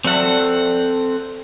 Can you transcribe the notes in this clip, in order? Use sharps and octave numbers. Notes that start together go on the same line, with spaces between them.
F3 C4 A4 E5 F#5